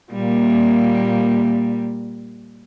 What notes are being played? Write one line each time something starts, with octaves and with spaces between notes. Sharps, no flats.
A#2 G3 A#3